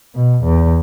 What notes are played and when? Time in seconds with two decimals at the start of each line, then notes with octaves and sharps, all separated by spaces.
0.15 B2
0.44 E2